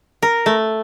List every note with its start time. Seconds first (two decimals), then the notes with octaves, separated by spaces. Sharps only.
0.22 A#4
0.46 A3